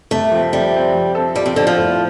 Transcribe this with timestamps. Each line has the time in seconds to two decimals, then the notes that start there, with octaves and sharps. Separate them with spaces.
0.11 C3 A3
0.32 F3 C4
0.53 C3 G3
0.74 F3 C4
0.94 F3
1.15 C4 A4
1.35 F3 G3
1.46 C3
1.56 D3 C4 A4
1.67 F3
1.77 A2